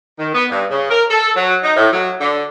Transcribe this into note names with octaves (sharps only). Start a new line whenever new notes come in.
D#3
B3
G2
C#3
A#4
A4
F#3
D#4
A2
F#3
D3